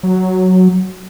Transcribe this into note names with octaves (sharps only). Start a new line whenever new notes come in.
F#3